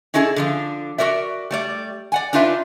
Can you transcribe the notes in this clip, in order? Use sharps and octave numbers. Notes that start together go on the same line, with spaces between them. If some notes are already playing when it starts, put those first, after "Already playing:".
C#4 D#4 E4 G#4 A4
D3 F3 D4
F#4 A4 A#4 D5 E5
G3 A3 D5
D5 F#5 G#5
D4 D#4 F4 B4 E5